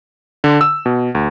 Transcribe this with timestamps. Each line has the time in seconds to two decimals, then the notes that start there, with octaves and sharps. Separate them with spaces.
0.44 D3
0.61 E6
0.86 B2
1.15 D2